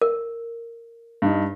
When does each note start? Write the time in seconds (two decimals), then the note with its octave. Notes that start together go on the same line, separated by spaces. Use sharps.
0.02 A#4
1.22 G2 D#4